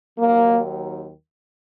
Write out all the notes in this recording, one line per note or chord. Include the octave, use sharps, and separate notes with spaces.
D#2 D#3 F#3 A#3